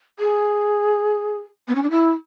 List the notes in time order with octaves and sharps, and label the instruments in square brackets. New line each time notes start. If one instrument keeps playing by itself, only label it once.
[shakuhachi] G#4
B3
C#4
D4
E4